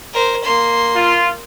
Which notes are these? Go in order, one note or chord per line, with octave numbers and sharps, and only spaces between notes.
A#4 C5
A#3 C6
F4